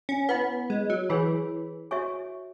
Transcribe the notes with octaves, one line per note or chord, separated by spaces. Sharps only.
C#4
B3 E4 B4 F#5 B5
G#3
F#3
E3 G#4 C#5 G#5 B5
F#4 C#5 E5 G#5 C#6